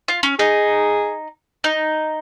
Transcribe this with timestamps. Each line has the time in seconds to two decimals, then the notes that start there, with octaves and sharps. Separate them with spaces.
0.08 F4
0.23 C#4
0.39 D#4 G#4
1.64 D#4